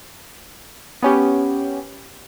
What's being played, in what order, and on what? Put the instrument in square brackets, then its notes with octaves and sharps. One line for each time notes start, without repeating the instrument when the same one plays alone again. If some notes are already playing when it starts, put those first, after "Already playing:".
[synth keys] B3 C#4 G4